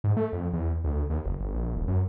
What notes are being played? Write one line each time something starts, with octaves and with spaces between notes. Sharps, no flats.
G#2
A3
F2
E2
D2
D#2
F#1
G1
A#1
D#1
F#2